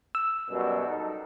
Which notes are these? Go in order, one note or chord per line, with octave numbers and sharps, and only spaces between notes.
E6
F#2 B2 G3
D#4 A4